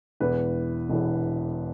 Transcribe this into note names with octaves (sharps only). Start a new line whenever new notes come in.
E1 E2 E3 B4
E1 E2 E3